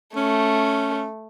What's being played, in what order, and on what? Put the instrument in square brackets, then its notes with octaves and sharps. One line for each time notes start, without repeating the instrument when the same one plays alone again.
[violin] A3 [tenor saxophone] C#4